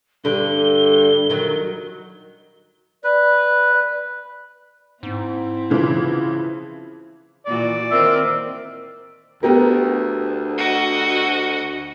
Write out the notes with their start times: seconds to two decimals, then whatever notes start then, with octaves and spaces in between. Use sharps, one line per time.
0.25 G2 D3 G7
1.30 D#3 F#3
3.04 B4 D5
5.03 G#2 C4 E4
5.70 C#3 E3 F3
7.46 A#2 E3 F#4 D5
7.91 D#3 C4 A#4 E5
9.43 D2 B3 G4 A#4
10.58 F#4 D#5